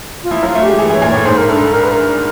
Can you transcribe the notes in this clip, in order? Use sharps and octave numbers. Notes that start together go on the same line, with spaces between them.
F4
F3 E4
F#3
F4
A3
G#3 G4
E3 G#4
E3
C#5
A#2
A2 C#5
G#2 C5
A#4
G2 A4
A4
A#4
B4
A#4